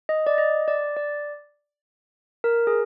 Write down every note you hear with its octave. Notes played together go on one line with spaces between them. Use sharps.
D#5
D5
D#5
D5
D5
A#4
G#4